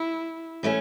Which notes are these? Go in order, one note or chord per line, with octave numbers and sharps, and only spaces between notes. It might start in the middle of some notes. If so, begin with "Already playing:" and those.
Already playing: E4
E3 A3 C#4